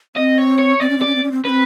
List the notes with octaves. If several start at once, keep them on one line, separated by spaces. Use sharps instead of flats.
C4 D#5
C#5
C#5
C4 D5
C#4
C4
C#4 D5
C4
C#4
C4
C4 C#4 B4